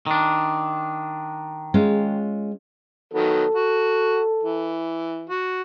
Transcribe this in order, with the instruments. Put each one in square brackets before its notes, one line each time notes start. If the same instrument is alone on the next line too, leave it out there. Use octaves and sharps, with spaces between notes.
[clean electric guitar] D#3 D4
[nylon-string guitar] G#3 C#4 F4
[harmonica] D#3 F#3 B3 [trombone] A4
[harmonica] F#4
E3
F#4